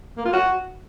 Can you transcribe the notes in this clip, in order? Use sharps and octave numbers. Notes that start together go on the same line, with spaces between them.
A#3
F4
F#4